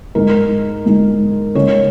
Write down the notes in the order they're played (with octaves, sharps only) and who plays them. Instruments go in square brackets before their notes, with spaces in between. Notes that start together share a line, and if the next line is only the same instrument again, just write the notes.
[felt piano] G#2 G#3 D#4 A#4
G#2 G#3 D#4
C#3 G#3 C#4 C#5